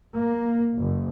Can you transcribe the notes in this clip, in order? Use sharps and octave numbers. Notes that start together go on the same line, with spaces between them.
A#3
F#1